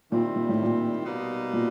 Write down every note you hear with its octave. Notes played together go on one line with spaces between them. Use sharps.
A#2 D#3 G3 C4 E4
A#2
A2
A#2
B2 G3 A#3 D#4
A#2